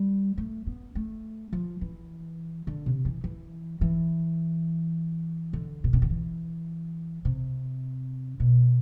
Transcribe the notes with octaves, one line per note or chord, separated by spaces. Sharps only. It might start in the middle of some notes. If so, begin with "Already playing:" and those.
Already playing: G3
A3
B3
A3
F3
E3
D3
C3
E3
E3
E3
D3
B2
C3
D3
E3
C3
B2